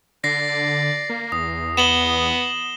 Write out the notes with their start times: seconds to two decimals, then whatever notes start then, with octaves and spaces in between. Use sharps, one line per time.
0.24 D3 D5 A#6 C7
1.10 A#3
1.32 E2 D#6
1.77 B3 E7 F#7 G7